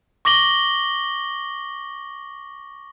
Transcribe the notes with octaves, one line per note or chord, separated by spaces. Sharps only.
C#6 D6 A#6 F#7 G7